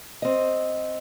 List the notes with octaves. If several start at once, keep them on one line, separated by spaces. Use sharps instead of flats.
C4 D#5